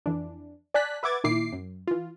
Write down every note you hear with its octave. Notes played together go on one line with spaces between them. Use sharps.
F2 E3 D4
D5 G#5 A5 F#6 B6
B4 E5 F#5 D6 G#6 A6
A#2 D#3 E4 D6 C7
F#2
E3 F4